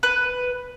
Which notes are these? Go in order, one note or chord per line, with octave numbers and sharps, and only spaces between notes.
B4